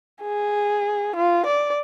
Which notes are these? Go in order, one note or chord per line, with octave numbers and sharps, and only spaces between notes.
G#4
F4
D5